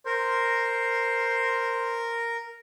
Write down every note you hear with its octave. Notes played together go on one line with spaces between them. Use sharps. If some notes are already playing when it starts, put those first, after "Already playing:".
A#4 C5